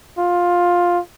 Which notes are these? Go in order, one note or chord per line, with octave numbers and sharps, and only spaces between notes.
F4